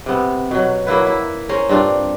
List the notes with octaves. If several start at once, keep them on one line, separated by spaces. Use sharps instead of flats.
C3 B3
B2 F#3
F#3 A#3 E4 B4
E4
C#4 A#4 C5
G2 C4 D4 F4